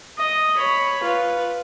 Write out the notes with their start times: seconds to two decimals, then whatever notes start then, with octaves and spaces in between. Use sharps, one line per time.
0.19 D#5
0.56 C#5 B5
1.04 F4 B4